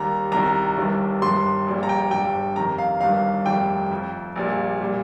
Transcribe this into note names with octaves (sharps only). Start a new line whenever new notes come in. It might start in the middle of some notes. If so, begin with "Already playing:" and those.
Already playing: D#2 D#3 G3 A#5
C2 C3 D#3 G3 A#5
G1 G2 D#3 G3
G1 G2 D#3 G3 C6
A#1 A#2 G3
A#5
G5
G1 G2 G3 G5
F2 C3 D#3 A#5
F5
G1 G2 D#3 G3 F5
F1 F2 D#3 G3 G5
F2 F3
A#1 A#2 G3
A#2 G3